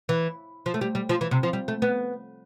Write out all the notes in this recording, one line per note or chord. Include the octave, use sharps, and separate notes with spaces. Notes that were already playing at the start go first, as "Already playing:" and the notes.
E3
F3
A3
G3
G3
F3
E3
C3
F3
G3
A3
B3